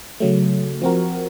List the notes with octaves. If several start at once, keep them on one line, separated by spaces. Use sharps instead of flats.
C#3 F#3 A3
F3 C4 F#4 A#4